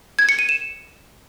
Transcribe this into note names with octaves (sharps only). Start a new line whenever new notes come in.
G#6
C#7
D#7
E7